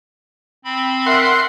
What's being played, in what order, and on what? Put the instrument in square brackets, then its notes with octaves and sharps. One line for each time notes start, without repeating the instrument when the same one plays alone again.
[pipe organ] C4 B5
[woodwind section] A#4 E5 [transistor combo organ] F#5 C6